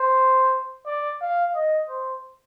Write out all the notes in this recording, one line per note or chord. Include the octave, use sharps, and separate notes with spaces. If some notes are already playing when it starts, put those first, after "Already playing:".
Already playing: C5
D5
F5
D#5
C5